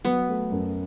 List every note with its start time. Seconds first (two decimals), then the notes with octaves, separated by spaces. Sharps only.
0.05 F#3 B3
0.29 A3
0.52 F#2